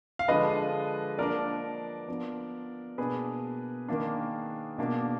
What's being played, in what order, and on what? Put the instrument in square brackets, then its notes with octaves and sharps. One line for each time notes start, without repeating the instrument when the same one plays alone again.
[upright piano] F5
D3 F3 G#3 D4 B4 D#5
F3 A#3 D4 A#4 D5
F3 B3 D4
B2 A#3 D4 G#4 B4
D#3 A#3 D4
B2 A#3 D4